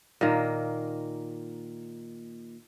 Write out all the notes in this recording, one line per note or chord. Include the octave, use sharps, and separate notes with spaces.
A#2 D#3 A#3